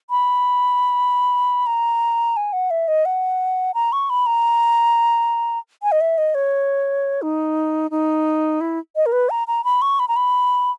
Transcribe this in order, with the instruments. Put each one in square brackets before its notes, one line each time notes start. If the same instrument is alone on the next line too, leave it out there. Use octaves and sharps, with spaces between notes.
[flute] B5
A#5
G#5
F#5
E5
D#5
F#5
A#5
C#6
B5
A#5
G#5
D#5
E5
D#5
C#5
D#4
D#4
E4
D#5
A#4
B4
A#5
A#5
B5
C#6
B5
A#5
B5